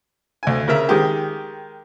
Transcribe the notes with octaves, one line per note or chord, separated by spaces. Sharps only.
D2 G#5
C#3 A#4 E5
D#3 G#3 G4